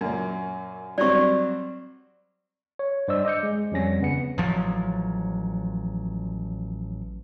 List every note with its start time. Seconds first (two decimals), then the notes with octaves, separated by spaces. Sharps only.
0.01 F#2 A#2
0.98 F#3 G3 C4 D5 C#6
2.79 C#5
3.08 G2 C5 D5 D#5 E6
3.25 D#5 D6 G6 C#7
3.43 G#3
3.72 F2 F3 G3 C#4 A#6
4.00 D#2 C#3 B3 C#7
4.38 A1 F3 F#3